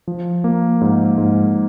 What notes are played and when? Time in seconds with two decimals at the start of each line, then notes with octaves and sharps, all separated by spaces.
0.07 F3
0.44 A#3
0.81 G#2
1.18 G#2